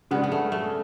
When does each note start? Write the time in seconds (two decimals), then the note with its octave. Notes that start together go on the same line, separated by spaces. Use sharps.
0.11 C#3 G#3 B3 D4
0.24 B3
0.32 A3
0.52 A3